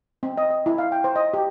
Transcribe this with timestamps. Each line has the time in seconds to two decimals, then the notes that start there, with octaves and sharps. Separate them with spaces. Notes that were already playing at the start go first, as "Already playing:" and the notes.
0.23 C4
0.38 D#5
0.50 D#5
0.66 E4
0.78 F5
0.92 G5
1.04 C5
1.16 D#5
1.34 G4